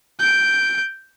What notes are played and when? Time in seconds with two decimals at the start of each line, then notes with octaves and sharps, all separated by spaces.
0.19 G6 D7